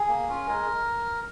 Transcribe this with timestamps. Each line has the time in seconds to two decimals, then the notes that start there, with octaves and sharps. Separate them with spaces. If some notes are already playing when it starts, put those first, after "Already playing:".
Already playing: G#4
0.09 A#3
0.28 C#4 F4
0.47 G#3 A#4